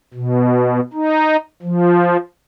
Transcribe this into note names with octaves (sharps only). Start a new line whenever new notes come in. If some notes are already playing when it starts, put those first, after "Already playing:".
B2
D#4
F3